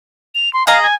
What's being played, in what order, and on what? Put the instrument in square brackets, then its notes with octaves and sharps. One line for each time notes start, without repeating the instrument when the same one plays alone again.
[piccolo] F7
C6
[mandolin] G#4 D#5 A#5 [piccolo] F5
[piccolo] G#5